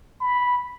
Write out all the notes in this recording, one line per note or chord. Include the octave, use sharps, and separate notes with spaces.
B5